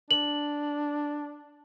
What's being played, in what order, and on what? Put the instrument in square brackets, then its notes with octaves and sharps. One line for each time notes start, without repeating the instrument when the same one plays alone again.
[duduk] D4 [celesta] F#7